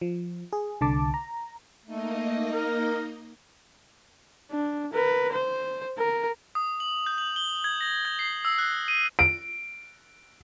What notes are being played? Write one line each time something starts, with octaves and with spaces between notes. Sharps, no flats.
F3
G#4
C2 D3 A5 D6
A#5
A3 A#3 D#4 D#5
A#4
D4
A#4 B4
C5
A#4
D#6
F#7
G6
F#7
G7
G#6
A#6
G#6
C7
E6
F#6
D#7
D7